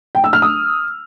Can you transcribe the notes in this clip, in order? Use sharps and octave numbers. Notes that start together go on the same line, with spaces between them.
G5
E6
F6
D#6